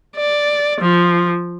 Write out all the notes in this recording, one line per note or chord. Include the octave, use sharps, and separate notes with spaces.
D5
F3